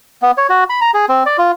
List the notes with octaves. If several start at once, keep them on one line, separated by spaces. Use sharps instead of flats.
B3
C#5
F#4
B5
A#5
G#4
C4
D5
F4